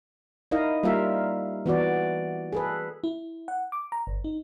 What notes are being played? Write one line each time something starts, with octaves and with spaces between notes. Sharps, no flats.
D#4 E4 A#4 D#5 F5
G3 A#3 F4 A#4 E5 F5
E3 B3 F#4 D5
G#4 A4 B4
E4
F#5
D6
A#5
G1
D#4